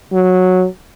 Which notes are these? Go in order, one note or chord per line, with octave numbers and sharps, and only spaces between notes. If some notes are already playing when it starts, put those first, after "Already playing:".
F#3